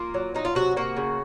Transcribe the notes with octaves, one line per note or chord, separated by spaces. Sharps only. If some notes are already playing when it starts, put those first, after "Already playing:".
Already playing: A#3 F4
F#3
F#3 D#4
F4
C3 F#4
A#3 F#4
C#3